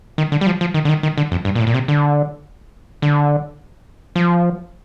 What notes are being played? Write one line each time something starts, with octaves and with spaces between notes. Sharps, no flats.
D#3
D3
G3
F3
F3
D#3
D3
D#3
D#3
D3
F2
G2
A#2
A2
A#2
C3
D3
D3
F3